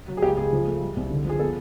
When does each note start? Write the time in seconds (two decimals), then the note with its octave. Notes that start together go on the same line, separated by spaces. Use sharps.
0.08 F#3
0.17 G#4
0.22 C#2 G4
0.37 C#2 G#4
0.53 F3
0.67 A3
0.81 G3
0.96 C2
1.10 D3
1.25 F3 G#4
1.39 B3 A4